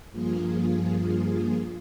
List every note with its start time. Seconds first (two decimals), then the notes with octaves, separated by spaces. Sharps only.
0.11 G2 F3 A#3 F4 G#4